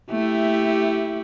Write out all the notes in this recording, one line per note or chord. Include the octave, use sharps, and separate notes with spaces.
A3 E4 G4